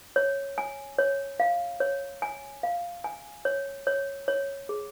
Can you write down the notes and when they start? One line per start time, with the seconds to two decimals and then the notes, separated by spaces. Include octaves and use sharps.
0.16 C#5
0.58 G#5
0.98 C#5
1.40 F5
1.80 C#5
2.22 G#5
2.63 F5
3.04 G#5
3.45 C#5
3.87 C#5
4.28 C#5
4.69 G#4